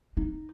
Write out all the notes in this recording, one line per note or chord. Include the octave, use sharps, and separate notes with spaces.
D#4